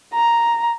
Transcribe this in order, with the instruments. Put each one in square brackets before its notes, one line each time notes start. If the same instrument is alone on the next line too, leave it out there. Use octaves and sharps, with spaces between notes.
[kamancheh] A#5